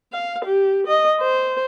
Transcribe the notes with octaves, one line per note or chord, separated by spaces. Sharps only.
F5
G4
D#5
C5